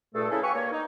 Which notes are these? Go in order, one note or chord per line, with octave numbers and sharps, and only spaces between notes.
G2 A#2 A3 G#4 A4
C#3 C#4 E4 G#4 A4
G4 B4 F5 G#5 C#6
G2 A#3 A#4 C#5
D#4